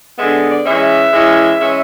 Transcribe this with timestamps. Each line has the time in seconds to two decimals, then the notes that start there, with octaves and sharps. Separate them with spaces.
0.18 D3 G#3 B3 E5
0.49 D5
0.65 E3 G#3 C#4 E5
1.13 E3 G#3 C#4
1.60 E3 G#3 C#4 E5